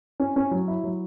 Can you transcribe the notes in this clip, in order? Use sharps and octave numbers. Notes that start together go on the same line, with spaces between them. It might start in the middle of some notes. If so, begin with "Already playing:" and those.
C#4
C#4
F#3
E4
F#3